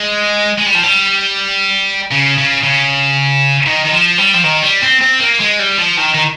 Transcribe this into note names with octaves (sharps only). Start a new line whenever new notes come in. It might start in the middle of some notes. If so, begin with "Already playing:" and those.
Already playing: G#3
G#3
G3
F3
G3
C#3
C#3
C#3
D#3
D#3
F3
G3
F3
D#3
G3
C4
C4
A#3
G#3
G3
F3
D#3
D#3